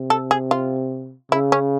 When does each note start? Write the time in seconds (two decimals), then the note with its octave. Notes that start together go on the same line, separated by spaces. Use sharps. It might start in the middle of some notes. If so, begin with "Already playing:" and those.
Already playing: C3
0.10 A4
0.31 G#4
0.51 F4
1.32 C#3 E4
1.52 C#4